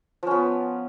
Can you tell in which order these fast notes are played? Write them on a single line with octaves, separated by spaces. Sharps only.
F3 C#4 B3